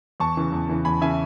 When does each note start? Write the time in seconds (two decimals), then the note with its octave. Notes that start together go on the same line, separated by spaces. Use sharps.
0.20 E2 A5 C#6
0.37 C#3 E3
0.52 E2
0.69 C#3 E3
0.85 E2 G#5 B5
1.01 C#3 E3 E5 G#5